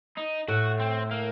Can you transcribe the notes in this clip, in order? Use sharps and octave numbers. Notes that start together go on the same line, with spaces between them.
D#4
A2 F#4
C4
A#3